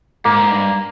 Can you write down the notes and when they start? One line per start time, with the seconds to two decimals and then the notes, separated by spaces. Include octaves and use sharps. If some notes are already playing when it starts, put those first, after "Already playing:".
0.25 G#2 A#3
0.51 G2